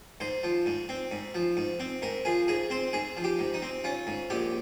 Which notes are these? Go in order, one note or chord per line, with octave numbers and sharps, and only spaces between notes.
G#2 C5
F3
G#2
C4
G#2
F3
G#2
C4
G#2 A#4
F3 G#4
G#2 G#4
C4 C5
G#2 G#4
F3
G4
G#2
D#4
C4
C#4 F4
G#2
A#1 G4